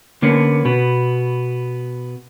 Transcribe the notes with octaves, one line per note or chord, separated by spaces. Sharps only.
D3 A#3 B3 C#4
B2 B3